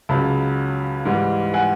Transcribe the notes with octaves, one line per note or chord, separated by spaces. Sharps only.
C#2 C#3 F#3 A5 B5
G#2 E3 G3
F#5 G#5